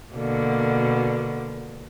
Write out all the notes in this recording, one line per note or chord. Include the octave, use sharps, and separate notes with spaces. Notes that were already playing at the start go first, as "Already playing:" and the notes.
B2 D3 A#3